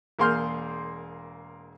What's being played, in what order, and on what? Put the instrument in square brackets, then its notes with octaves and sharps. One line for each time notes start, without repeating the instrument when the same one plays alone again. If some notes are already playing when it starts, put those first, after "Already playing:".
[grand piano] E1 A#3 G#4 C6 F6 G6